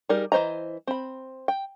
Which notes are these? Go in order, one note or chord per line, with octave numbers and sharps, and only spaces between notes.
G3 D#4 G#4 A#4 D5
E3 C4 C5 D#5 A#5
C4 B5
G5